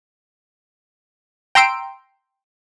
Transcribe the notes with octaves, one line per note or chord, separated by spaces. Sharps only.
G5 A#5 C6 E6 D7